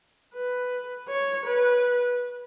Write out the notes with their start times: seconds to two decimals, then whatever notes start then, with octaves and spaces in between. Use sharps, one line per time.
0.34 B4
1.08 C#5
1.46 B4